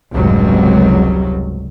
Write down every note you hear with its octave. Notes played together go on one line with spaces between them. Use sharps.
F1 C#2 G#2 F#3 G3